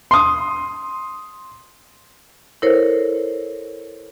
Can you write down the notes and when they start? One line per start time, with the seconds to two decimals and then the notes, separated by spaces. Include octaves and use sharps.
0.11 C6 D#6
2.62 E4 A4 A#4 C5 C#5